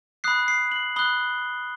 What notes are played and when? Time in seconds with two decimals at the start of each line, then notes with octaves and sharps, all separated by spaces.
0.24 B5 D#6 F#6 C7
0.48 C7
0.72 F#7
0.96 B5 D#6 F#6 G7